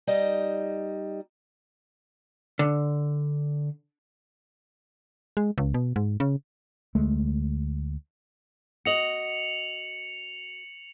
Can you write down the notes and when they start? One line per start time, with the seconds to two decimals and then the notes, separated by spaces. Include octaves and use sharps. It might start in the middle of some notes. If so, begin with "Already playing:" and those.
0.07 G3 D#4 D#5
2.59 D3
5.37 G#3
5.58 C#2
5.74 B2
5.96 G#2
6.20 C#3
6.95 D2 G#3 A3
8.85 F#4 D#5 C#7 F7 F#7